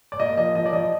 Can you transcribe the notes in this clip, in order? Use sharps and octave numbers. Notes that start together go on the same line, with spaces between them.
D5
A#3 D#5
F3 D#5
F3 D#5
D5
F3 D#5